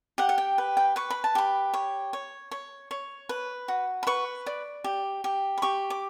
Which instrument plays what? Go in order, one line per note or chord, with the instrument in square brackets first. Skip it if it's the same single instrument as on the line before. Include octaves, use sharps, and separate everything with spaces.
[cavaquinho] G4 F#5
F#5
G5
B4
G5
B4 C#6
B5
A5
G4 B5
C#5
C#5
C#5
C#5
B4
F#4
B5
B4 C#6
D5
G4
G4
B5
G4 C#6
D6